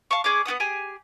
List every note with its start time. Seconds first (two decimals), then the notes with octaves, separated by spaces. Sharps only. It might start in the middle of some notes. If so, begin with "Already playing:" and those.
0.11 F5 A5 C#6
0.24 C#4 G#4 D5 D6
0.45 B3 F#4 F#5 D#6
0.60 G4 G#4 G#5